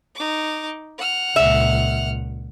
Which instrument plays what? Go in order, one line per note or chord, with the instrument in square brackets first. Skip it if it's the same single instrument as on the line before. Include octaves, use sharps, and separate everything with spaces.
[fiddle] D#4 D6
F#5 F6
[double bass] C#2 A#2 [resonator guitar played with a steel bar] E5